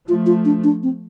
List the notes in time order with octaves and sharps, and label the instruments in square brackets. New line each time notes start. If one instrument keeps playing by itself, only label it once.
[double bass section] F3 A3 [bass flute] F4
[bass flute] F4
D4
D4
C4